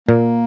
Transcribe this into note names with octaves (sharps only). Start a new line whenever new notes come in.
A#2 A#3